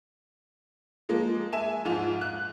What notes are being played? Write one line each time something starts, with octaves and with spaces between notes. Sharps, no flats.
F3 G#3 A#3
E5 G#5 E7
G#2 F3 F4 F7
F#6